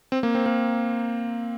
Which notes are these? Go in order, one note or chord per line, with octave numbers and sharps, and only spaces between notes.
C4
A#3
C4
A#3